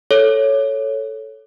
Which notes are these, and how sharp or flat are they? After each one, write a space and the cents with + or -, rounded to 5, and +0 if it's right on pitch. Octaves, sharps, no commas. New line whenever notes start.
A4 +0 C#5 +0